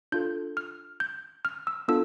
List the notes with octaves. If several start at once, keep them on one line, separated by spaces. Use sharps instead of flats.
D4 F4 A4 G6
F6
G6
F6
E6
B3 D4 F4 A4 E6